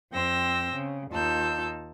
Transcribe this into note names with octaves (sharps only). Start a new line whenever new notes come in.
F2 C4 G5 E6 A#6
C#3
D#2 D#4 F4 A5 E6 G6